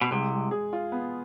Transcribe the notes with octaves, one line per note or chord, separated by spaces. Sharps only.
B2
C2 C3 G#3
G#3
G#4
F4
B3